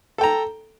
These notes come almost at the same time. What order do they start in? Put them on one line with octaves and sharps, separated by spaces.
A4 G5 A#5